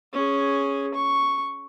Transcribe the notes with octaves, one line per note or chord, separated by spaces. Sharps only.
C#4 G#4
C#6